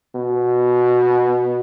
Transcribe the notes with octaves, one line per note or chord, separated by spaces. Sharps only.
B2